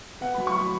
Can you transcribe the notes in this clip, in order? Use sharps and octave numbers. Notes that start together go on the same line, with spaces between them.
B3 F#5
F#3 B5
C#6
F#3 B5